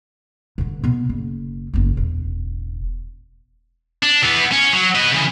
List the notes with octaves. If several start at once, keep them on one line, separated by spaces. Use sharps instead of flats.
G2 D3
B2 B3
F#1
F#1 B3
E1 A1
D4
E3 B3
C#4
F#3
B4 D#5
C#3 E3